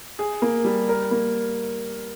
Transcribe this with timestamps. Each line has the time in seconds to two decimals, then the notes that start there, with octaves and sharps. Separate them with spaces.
0.19 G#4
0.42 A#3
0.65 G3
0.89 A#4
1.11 A#3